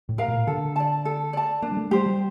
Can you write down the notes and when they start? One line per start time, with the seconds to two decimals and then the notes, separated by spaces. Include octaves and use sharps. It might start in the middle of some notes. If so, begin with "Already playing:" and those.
0.09 A2
0.18 A#4 F5 A#5
0.28 A#2
0.47 D3 A4
0.76 D5 A5
1.05 A4
1.33 D5 A5
1.62 A#3 D4
1.72 G3
1.77 A3
1.91 G3 G4 C5
2.06 G3